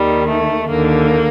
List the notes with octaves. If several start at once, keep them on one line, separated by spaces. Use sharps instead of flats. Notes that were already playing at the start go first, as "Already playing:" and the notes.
Already playing: D#2 D#3 G3
A3
D#2 D3 A#3